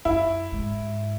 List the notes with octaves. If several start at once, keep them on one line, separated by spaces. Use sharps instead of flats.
F#2 E4
G#2